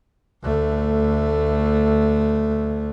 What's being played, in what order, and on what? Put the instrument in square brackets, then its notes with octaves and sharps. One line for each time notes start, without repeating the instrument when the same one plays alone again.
[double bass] D2 A3